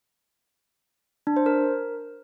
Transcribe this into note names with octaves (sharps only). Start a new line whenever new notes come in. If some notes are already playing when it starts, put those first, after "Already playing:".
D4
C5
A#4